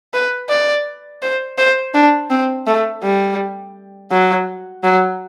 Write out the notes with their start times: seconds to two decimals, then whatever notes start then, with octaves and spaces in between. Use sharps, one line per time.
0.13 B4
0.49 D5
1.22 C5
1.58 C5
1.94 D4
2.30 C4
2.66 A3
3.03 G3
4.11 F#3
4.83 F#3